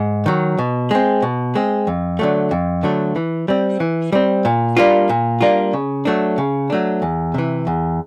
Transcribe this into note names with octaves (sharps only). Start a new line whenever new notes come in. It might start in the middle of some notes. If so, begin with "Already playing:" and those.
Already playing: G#2
D#3 F#3
B2
G#3 C4
B2
G#3 C4
F2
D3 F#3 A3
F2
D3 F#3 A3
E3
G3 C4
E3
G3 C4
A#2
G3 A#3 D4 F4
A#2
G3 A#3 D4 F4
C#3
F#3 A3 D4
C#3
F#3 A3 D4
E2
C3 E3
E2